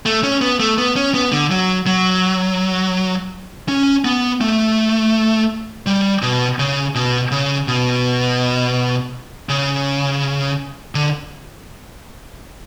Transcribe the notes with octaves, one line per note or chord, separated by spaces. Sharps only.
A3
C#4
B3
A3
B3
C#4
B3
D3
F#3
F#3
C#4
B3
A3
G3
B2
C#3
B2
C#3
B2
C#3
D3